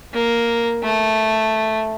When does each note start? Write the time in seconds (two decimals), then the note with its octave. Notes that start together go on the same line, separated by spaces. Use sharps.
0.13 A#3
0.83 A3